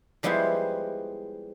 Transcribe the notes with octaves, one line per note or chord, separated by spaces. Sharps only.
F3 G3 G#3 B3 E4 C5